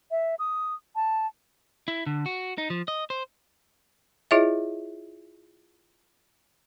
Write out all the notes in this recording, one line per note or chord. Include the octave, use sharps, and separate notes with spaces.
E5
D#6
A5
E4
D3
F#4
D#4
F3
D#5
C5
E4 F4 G#4 C#5 D#5 E5